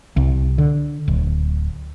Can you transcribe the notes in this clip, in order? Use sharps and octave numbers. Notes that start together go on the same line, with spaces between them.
C2
D3
D1